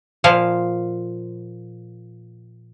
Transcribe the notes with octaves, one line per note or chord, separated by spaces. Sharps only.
A#2 F3 F5